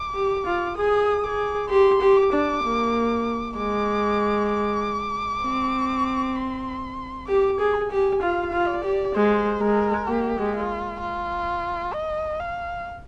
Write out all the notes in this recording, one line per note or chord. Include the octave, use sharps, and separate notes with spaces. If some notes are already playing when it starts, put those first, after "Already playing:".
Already playing: D6
G4
F4
G#4 D#6
G#4 D6
G4 C6
G4
D6
D4
A#3
G#3 D6
D6
C4
C6
G4 D6
G#4
G#5
G4
F4 F5
F4
D5
G4
G#3 C5
G#3 A#4
A#3 G4
G#3
F4
F4
D#5
F5